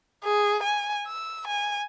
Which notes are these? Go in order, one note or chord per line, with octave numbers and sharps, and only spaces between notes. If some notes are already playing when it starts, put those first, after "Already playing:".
G#4
G#5
E6
G#5